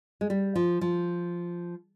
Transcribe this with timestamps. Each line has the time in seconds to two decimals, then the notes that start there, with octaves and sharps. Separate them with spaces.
0.21 G#3
0.30 G3
0.55 F3
0.81 F3